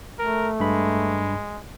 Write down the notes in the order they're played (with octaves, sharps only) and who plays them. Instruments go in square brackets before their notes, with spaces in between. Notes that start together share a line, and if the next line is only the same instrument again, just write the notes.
[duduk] A3 [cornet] A#4
[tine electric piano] G2 B5 [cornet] G#3